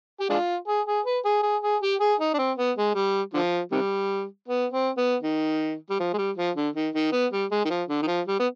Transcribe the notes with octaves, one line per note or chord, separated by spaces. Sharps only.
G4
G#3 D4 F4
G#4
G#4
B4
G#4
G#4
G#4
G4
G#4
D#4
D4
C4
B3
G#3
G3
D3 F3
C3 D#3 G3
B3
C4
B3
D#3
G3
F3
G#3
G3
F3
D3
D#3
D#3
B3
G3
G#3
D#3
F3
D3
D#3
F3
G3
B3